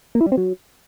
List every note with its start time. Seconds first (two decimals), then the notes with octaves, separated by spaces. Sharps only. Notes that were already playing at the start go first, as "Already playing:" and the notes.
0.15 A#3
0.21 E4
0.26 G3
0.32 C4
0.37 F#3